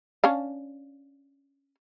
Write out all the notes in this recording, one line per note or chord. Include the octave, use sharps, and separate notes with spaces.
C#4 D4 F5